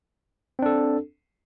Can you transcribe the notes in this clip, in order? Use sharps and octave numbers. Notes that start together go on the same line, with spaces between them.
C4 D4 A4